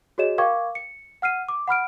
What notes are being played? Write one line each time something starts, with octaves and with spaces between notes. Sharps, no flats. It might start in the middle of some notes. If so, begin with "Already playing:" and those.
F#4 G#4 C#5 D#5 E7
A#4 F5 G5 C#6 D6 G#6
C#7
F#5 F6 C7 D#7
D6
F#5 B5 F6 D7